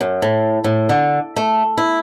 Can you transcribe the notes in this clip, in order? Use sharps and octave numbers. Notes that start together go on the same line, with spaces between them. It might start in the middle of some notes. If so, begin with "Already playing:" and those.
F#2
A2
A2
D3
A3
E4